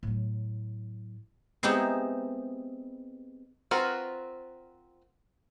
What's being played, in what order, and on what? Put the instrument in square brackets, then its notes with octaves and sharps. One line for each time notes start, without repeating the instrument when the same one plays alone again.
[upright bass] A2 F#3
[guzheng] G#3 B3 C4 D#4 E4 G4
[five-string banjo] C4 F4 F#4 A#4 B4